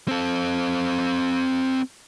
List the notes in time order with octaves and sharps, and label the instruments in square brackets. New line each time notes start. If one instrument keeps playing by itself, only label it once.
[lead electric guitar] C4 A4